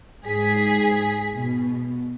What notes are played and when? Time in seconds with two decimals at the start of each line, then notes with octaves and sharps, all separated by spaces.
0.24 G#2 G#4 B6
1.35 B2